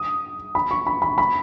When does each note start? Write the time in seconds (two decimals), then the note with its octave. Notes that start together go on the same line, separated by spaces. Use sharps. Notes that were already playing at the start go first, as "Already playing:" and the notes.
Already playing: D#6
0.55 B5
0.71 C#6
0.87 B5
1.02 B5
1.18 B5